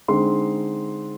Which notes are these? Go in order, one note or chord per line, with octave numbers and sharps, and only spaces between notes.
D3 G#3 C4 D#4 C6